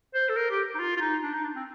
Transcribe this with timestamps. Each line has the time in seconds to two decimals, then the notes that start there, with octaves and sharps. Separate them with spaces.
0.14 C5
0.29 A4
0.36 A#4
0.50 G4
0.75 D#4
0.79 F4
0.97 F4
1.01 D#4
1.23 D4
1.33 D#4
1.44 D4
1.55 C4